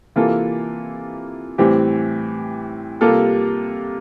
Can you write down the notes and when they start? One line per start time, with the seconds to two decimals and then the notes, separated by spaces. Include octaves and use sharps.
0.16 C3 E3 A#3 F4 A4
1.58 A2 E3 G3 C4 G4
3.01 C3 G3 A#3 F4 A4